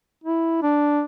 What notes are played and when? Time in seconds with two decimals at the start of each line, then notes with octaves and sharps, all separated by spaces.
0.24 E4
0.62 D4